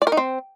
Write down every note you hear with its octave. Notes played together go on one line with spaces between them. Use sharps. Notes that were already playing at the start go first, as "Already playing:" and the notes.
D5
A#4
D#4
C4